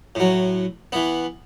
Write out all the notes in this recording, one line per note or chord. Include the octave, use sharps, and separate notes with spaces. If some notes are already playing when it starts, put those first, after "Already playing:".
A2 F#3
E3 B3